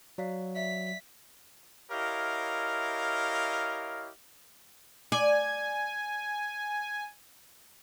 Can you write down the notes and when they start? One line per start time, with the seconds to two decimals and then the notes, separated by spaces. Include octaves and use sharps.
0.18 F#3 D5 F5 B6
0.56 D5 E5 B6
1.91 E4 G4 A#4 C#5 D#5 F5
5.12 D5 G#5